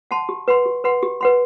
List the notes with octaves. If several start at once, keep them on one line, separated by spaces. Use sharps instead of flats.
F#5 A5 C6
G4
B4 F#5 C6
G4
B4 F#5 C6
G4
B4 F#5 C6